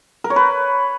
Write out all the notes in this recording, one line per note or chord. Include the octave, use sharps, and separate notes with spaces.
A#4
C#5
B4